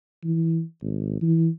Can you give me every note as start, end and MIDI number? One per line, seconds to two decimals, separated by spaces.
0.24 0.62 52
0.82 1.18 32
1.22 1.49 52